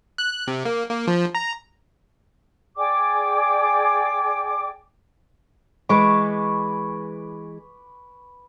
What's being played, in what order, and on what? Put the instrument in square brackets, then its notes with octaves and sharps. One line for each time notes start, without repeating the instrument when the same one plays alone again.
[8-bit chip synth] F#6
F#6
C3
A#3
A#3
F3
A#5
[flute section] G#4 D5 G5 D6
[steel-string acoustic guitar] E3 G#3 [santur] B4 C#6 D6